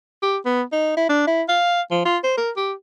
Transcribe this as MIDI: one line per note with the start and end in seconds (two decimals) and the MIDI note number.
0.22 0.38 67
0.45 0.63 59
0.72 0.96 63
0.97 1.07 64
1.09 1.26 62
1.27 1.43 64
1.49 1.82 77
1.91 2.03 53
2.05 2.18 65
2.23 2.35 72
2.37 2.51 70
2.56 2.73 67